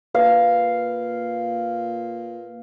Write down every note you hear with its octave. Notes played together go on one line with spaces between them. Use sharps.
A#2 B4 F5